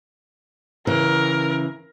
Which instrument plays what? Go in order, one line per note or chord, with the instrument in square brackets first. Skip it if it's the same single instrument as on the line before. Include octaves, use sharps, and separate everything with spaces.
[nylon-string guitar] C#3 E3 [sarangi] A#4